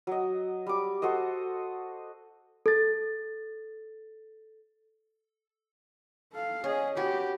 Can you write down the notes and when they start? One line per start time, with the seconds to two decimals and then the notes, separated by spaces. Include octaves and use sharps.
0.07 F#3 D#5
0.66 G3 D6
1.02 F#4 A4 C5 D#5
2.66 A4 A6
6.33 A4 F5
6.64 C#4 G#4 D#5
6.97 F#4 G4 B4